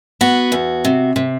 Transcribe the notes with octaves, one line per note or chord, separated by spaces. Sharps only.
B3 F#4
E2
C3
C3